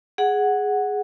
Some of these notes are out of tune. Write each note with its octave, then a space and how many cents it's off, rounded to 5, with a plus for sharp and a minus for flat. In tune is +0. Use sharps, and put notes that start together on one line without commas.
G#4 +0 F#5 +0